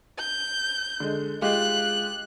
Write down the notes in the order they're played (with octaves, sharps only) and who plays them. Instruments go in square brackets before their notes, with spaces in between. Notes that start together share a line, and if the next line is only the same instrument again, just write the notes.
[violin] G6
[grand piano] D3 G#3
[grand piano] G#3 F4 G4 [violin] F#6